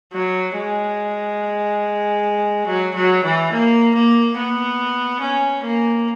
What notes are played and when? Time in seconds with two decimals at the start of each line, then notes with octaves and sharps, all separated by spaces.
0.13 F#3
0.56 G#3
2.67 F#3
2.95 F#3
3.24 E3
3.52 A#3
3.95 A#3
4.37 B3
5.22 C#4
5.64 A#3